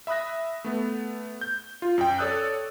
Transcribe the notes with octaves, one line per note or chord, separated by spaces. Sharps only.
E5 B5 D#6 F#6 A#6
A3 B3
G6
F4
F#2 G5
A4 C#5 D5 D#6 E6 F#6